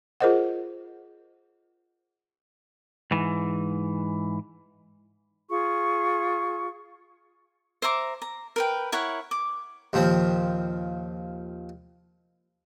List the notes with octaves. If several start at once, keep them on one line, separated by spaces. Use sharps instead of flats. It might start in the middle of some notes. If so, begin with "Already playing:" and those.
F4 G#4 A#4 C5 D#5 F#5
G#2 E3
F4 G#4 C#6
C5 E5 A#5 D6
A#5
A#4 B4 G5
E4 A#4 C#5 F#5
D6
D#2 A#2 F3 C4